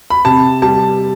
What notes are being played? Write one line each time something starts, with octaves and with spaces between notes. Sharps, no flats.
B5
C3 A5
G3 A5